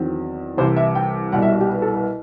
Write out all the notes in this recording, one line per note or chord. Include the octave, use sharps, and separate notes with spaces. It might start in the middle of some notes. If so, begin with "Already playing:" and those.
Already playing: E2 D#3 F#3 C4
C2 C3 E3 C5
E5
G5
C2 B2 G3 F#5
E5
F#4
G4
B4
A4
B4